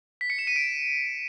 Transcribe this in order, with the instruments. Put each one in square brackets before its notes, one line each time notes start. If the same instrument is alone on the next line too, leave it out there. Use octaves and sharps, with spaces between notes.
[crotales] B6
C#7
E7
D#7
D7